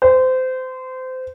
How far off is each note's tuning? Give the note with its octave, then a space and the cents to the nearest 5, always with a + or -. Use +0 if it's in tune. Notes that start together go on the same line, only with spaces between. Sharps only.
C5 -25